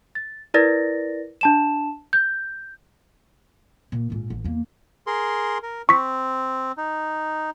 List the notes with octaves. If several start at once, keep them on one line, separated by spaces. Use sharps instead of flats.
A6
E4 A#4 B4 D5 A6 A#6
D4 A5 E7
G6
A#2
A#1 G#2
A1
E2 A#3
G#4 A#4 C6
A#4
C4 C#6 B6
D#4